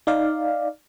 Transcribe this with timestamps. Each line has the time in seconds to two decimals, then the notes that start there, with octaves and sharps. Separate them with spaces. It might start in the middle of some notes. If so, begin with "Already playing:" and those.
0.07 D#4 D5 F5